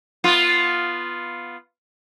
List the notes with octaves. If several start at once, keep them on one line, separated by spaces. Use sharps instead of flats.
B3 F4